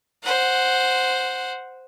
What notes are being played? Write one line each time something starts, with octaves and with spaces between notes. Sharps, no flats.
C5 F#5